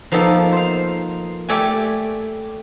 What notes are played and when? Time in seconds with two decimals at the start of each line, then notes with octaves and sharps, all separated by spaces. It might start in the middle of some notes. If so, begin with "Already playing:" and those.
0.12 F3 A#3 B3 D#4 A4
0.52 C5 F5
1.49 A3 G4 A4 D5 G5 G#5